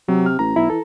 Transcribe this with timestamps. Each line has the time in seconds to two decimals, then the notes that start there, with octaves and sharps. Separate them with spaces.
0.08 C3 F#3
0.26 F6
0.39 A1 A#5
0.56 B1 E4
0.70 E3 A4